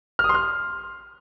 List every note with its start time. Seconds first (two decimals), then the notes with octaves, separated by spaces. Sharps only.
0.19 F6
0.24 D#6
0.29 C6
0.34 F6